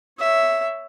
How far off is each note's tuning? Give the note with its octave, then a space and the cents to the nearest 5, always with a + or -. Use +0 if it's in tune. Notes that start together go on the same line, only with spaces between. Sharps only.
C#5 +0 E5 +0